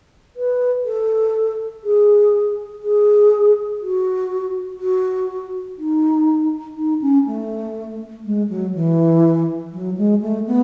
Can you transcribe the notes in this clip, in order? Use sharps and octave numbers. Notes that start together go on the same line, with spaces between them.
B4
A4
G#4
G#4
F#4
F#4
D#4
D#4
C#4
A3
G#3
F#3
E3
F#3
G#3
A3
B3